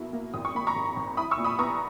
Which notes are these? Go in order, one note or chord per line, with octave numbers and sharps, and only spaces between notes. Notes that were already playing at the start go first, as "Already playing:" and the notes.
Already playing: B2 A#3 E4
A#3
G#1 D#6
C#6
A#3 B5
A#5 C#6
G#1
G#1
E4 B5 D#6
C#6 E6
A#2
B5 D#6
B3 A#5 C#6